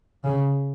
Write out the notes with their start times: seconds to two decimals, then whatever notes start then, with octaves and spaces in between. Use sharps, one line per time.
0.24 C#3